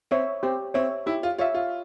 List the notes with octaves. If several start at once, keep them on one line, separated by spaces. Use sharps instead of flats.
C4 C#5 E5
C4 G4
C4 C#5 E5
E4 G4
F4
F4 C#5 E5
F4